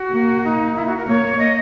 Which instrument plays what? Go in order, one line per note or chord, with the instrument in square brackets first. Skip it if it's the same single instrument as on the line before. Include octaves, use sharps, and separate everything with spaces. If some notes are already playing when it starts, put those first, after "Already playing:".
Already playing: [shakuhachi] F#4
[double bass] A#3
[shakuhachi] D#4
E4
F#4
A#4
[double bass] A#3 [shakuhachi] C#5
[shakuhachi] D#5